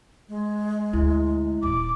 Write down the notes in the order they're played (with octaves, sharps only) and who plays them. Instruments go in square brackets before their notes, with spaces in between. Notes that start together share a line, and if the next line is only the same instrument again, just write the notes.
[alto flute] G#3
[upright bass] D2 [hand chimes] E4
[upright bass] D#1 D#2 [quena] D6